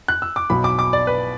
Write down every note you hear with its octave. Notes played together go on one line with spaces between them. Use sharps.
F#6
E6
D6
B1 B2 F#3 B5
D6
D6
D5
B4